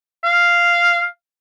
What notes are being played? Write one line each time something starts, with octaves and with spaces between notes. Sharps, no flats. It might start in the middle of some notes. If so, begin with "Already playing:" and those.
F5